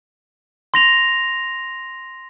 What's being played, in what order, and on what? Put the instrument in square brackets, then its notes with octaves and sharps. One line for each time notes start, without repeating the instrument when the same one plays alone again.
[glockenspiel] C6 A#6 F7